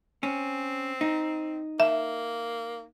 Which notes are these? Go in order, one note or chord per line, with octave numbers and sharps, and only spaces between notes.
C4 C#4
D#4
A#3 E5